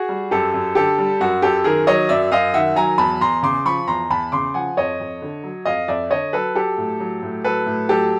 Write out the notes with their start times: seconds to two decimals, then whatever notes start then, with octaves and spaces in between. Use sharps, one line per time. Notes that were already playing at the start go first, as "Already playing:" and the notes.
Already playing: F#4 G#4
0.09 G3
0.31 F#2 G4 A4
0.54 F#2
0.75 D3 G4 A4
0.98 G3
1.20 F#2 F#4
1.42 F#2 G4 A4
1.64 D#3 G#4 A#4
1.87 F#3 C#5 D#5
2.09 F#2 D5 E5
2.32 F#2 D#5 F5
2.54 D#3 E5 F#5
2.76 F#3 G#5 A#5
2.98 E2 A5 B5
3.21 E2 A#5 C6
3.43 C#3 C6 D6
3.65 F3 B5 C#6
3.87 E2 A#5 C6
4.10 E2 A5 B5
4.32 C#3 C6 D6
4.54 F3 F#5 G#5
4.77 F2 C#5 D#5
5.00 F2
5.22 D3
5.43 F#3
5.65 F2 D#5 F5
5.88 F2 D5 E5
6.11 D3 C#5 D#5
6.33 F#3 A4 B4
6.55 F#3 G4 A4
6.78 A2
7.00 F#3
7.23 A2
7.44 F#3 A4 B4
7.66 A2
7.89 F#3 G4 A4